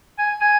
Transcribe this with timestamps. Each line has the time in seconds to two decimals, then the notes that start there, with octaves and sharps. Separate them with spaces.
0.19 G#5
0.41 G#5